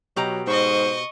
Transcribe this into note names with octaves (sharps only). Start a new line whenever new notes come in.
B2 F#3 G4 A#5
G#2 C5 D#5 C#6